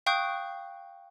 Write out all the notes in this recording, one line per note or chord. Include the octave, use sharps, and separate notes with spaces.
F5 G5 C#6 D#6 F#6 G6